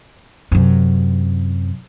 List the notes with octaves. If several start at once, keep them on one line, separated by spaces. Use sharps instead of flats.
F#2 C3